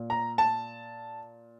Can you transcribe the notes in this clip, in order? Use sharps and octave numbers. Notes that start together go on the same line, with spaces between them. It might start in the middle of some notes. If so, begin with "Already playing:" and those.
Already playing: A#2
A#5
A5